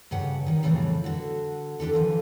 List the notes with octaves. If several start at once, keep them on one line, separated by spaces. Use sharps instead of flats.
G2 C#3 G4 F#5
D#3 G3
F2 A2 C#3 E3 F3 G3
D3 F#4
D4 F4 G4 A4
D3 E3 F3